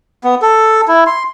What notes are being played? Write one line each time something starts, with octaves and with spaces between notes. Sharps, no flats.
B3
A4
E4
C6